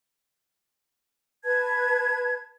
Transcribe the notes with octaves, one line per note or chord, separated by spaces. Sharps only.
B4 A5 G#6